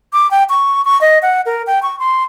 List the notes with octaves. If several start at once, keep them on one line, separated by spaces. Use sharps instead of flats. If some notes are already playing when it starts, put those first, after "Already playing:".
D6
G5
C#6
C#6
D#5
F#5
A#4
G5
C#6
C6